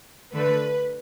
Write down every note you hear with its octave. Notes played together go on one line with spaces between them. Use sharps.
D3 A3 B4